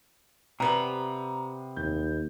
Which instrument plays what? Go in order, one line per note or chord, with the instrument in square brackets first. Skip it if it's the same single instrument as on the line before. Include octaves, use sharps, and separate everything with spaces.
[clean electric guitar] C3 [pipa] G3 B3 [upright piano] A#5
[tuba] D#2 [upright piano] G6